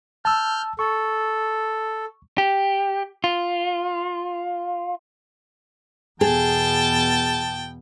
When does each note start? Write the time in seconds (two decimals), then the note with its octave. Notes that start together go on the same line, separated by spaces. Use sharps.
0.25 A5 E6 F6 G6
0.79 A4 C#6
2.38 G4
3.24 F4
6.21 E2 B2 G#4 G5 A5